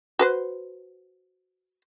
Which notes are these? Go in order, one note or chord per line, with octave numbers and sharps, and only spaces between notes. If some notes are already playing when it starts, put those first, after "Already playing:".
F#4 B4 C5